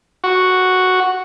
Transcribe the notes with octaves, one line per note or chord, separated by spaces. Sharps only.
F#4